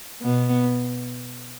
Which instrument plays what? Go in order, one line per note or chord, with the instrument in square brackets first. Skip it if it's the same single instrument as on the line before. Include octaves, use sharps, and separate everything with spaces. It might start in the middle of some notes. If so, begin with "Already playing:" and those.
[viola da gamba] B2 B3